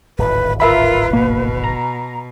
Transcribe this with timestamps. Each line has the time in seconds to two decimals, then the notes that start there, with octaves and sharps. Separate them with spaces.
0.19 D1 G#1 D#2 B4
0.60 F4 A#4 B4 E5 B5
1.13 B2 A#3
1.64 A#5